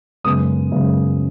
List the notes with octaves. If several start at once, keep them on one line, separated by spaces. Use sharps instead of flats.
F#2 C#3 G#3 B3 D#6
F#2 C#3 G#3 B3